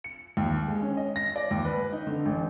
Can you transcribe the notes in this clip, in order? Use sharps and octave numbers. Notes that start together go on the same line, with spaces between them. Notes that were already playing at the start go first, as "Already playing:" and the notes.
C#7
D#2
G#3
C#4
D#5
A#6
D5
D#2
B4
D#4
D3
A1